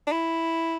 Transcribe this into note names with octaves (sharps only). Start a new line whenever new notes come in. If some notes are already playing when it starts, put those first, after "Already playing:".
D4
E4